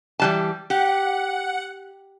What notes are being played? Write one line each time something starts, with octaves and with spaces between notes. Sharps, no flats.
E3 G3 A5
G4 F#5